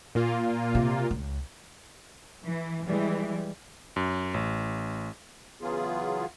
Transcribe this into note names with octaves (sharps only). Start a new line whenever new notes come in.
A#2 A#3 F4
C3
C#2
E3
E3 G3 G#3
F#2
A1
C#3 E3 F#3 B3 F4 G#4